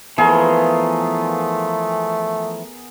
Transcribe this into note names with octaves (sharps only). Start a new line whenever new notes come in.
E3 F3 A3 B3 F4 G#4 A#4 C#6